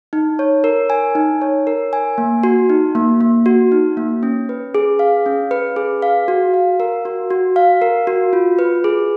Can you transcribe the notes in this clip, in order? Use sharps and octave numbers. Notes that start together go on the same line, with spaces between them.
D#4
C#5
A#4
G#5
D#4
C#5
A#4
G#5
A#3
F#4
D#4
A#3
A#3
F#4
D#4
A#3
C#4
B4
G#4
F5
C#4
B4
G#4
F5
F#4
F5
A#4
F#4
F#4
F5
A#4
F#4
F4
B4
G#4